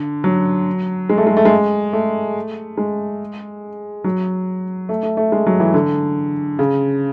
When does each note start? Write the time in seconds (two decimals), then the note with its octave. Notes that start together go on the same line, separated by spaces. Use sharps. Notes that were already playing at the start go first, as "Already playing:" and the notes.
Already playing: D3
0.24 F#3
1.10 G#3
1.18 A3
1.27 G#3
1.37 A3
1.45 G#3
1.93 A3
2.78 G#3
4.04 F#3
4.89 A3
5.03 A3
5.17 A3
5.32 G#3
5.47 F#3
5.60 E3
5.74 D3
6.59 C#3